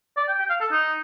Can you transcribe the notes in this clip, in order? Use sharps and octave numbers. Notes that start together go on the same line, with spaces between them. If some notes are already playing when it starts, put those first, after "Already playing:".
D5
G5
G5
F5
A4
D#4